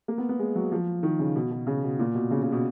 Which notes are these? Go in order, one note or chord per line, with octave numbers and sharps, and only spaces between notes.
A#3
B3
B3
G#3
F#3
F3
D#3
C#3
B2
B2
C#3
B2
A#2
B2
C#3
C#3
B2